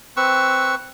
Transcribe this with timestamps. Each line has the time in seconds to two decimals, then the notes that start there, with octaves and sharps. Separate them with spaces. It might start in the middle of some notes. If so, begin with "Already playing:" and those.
0.17 C4 B4 C#6 E6